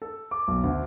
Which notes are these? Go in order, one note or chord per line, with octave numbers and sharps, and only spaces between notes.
A4
D6
B1
D2